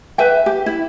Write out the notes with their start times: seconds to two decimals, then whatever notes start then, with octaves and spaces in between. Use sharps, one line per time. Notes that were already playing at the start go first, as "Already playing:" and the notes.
0.18 B4 E5 G5
0.46 G4
0.66 E4